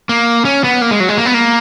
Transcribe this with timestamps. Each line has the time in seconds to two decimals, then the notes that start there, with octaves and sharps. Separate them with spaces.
0.09 A#3
0.45 C#4
0.64 B3
0.81 A#3
0.91 G#3
1.00 F#3
1.09 G#3
1.18 A#3
1.26 B3
1.34 A#3